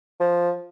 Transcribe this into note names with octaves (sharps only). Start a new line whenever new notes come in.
F3